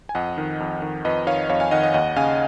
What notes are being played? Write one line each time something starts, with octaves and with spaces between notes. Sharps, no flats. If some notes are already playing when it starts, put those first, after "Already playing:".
G#5
F2 D#5 F#5
D#3
F2
D#3
F2 B4 D#5
D#3 C#5 F5
F2 C#5 F5
F5 G#5
D#3 D#5 F#5
D#5 F#5
D#2 D#5 F#5
C#3 F5 G#5